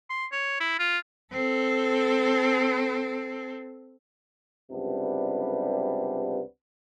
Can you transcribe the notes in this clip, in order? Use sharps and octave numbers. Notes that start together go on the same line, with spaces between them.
C6
C#5
E4
F4
C4 A4
C#2 F#2 C3 G3 B3 D4